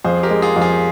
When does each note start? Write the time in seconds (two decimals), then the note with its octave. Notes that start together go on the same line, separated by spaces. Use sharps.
0.04 F2 G#4 C5
0.23 G4 A#4
0.30 G#3
0.42 F4 G#4
0.56 F2
0.62 F4 G#4